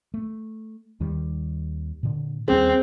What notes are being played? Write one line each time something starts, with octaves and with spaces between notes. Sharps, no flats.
A3
D#2 D#3 G3
A#2 D3
D#2 G3 C4 C#4 G#4 C5